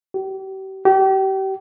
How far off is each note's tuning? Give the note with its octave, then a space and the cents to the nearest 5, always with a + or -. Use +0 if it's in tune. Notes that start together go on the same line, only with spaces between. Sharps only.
G4 -40
G4 -35